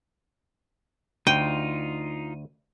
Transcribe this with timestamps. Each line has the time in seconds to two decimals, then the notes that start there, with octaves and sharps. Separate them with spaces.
1.27 D2 D#4 F4 G5 D#7